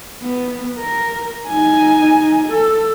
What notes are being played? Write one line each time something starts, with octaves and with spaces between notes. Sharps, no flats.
B3
A#4
D#4 G#5
A4